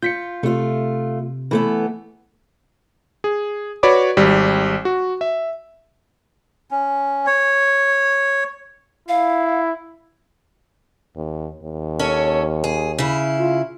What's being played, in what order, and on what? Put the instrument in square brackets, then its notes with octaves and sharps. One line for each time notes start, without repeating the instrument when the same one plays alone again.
[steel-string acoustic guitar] F4 [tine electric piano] G6 B6 C#7
[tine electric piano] C3 [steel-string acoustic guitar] A3 F4
[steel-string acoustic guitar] E3 A3 B3
[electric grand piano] G#4
F#4 B4 C#5 D5 B5 D6
G#1 G3
F#4
E5
[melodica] C#4
C#5
[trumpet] E4 [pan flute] F5
[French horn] D#2
D#2
[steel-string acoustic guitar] C#4 A4 C#5
G#4
C#3 E4
[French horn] F4